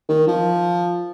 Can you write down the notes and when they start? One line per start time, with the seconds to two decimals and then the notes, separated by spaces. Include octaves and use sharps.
0.09 D#3
0.28 F3